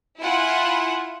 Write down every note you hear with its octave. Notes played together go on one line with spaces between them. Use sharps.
E4 F4 F#5 G#5